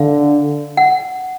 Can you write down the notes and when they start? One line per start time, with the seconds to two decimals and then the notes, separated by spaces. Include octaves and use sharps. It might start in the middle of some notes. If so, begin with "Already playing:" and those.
Already playing: D3 F5
0.77 F#5